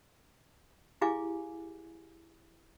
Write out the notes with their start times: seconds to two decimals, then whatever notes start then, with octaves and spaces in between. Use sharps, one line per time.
1.01 E4 G4 G#4 F5 G#5 D6